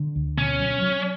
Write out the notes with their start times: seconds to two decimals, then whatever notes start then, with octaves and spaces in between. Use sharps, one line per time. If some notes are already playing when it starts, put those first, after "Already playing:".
Already playing: D3
0.16 D2
0.38 B2 C#4
0.60 F#3
0.82 F#3